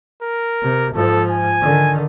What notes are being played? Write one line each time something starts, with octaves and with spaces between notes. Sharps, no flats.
A#4
C3
G#2 F3 A4
G#5
D3 D#3